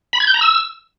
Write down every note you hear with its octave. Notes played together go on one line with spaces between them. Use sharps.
B5
G#6
G6
A#5
E6